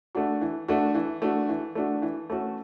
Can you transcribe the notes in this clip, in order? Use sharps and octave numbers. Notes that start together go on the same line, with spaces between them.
A3 D4 F#4
E3
A3 D4 F#4
E3
A3 D4 F#4
E3
A3 D4 F#4
E3
A3 C#4 F#4